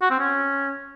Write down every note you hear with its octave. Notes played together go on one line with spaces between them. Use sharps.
F#4
C4
C#4